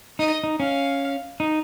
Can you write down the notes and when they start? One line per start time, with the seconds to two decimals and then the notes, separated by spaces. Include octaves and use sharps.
0.19 D#4 D#5
0.44 D#4
0.60 C#4 F5
1.40 D#4